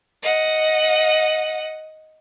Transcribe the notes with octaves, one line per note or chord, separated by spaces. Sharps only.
D#5 F#5